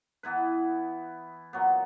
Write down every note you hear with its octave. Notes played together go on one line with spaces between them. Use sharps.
E3 B3 E4 B4
A#2 F#3 B3